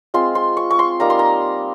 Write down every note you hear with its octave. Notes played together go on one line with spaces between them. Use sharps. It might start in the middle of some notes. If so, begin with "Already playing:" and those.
G#3 C4 F4 C6
C6
C#6
C#6
C6
G3 A#3 D#4 A#5
C6
A#5